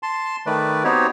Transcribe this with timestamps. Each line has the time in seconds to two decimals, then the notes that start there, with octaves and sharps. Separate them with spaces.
0.03 A5 C6
0.46 D#3 A3 B4 D5
0.84 B3 C4 D#4 F#4 G4 C#5